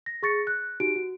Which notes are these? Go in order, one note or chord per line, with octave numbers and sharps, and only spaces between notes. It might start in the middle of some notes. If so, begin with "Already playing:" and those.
A#6
G#4 C#6 A6 A#6 C#7
F#6
D#4 F#4 G4 D7
F#4